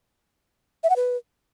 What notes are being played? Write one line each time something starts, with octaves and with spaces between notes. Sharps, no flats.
E5
F#5
B4